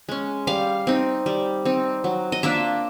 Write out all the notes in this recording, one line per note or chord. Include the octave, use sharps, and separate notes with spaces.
G#3 C#4
G3 F5
C4 D#4
G3
C4 D#4
F#3
D#5
A#3 D4 F4 E5